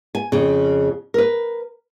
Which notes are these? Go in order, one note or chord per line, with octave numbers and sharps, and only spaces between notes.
G#5
F2 C#3
A#4 B4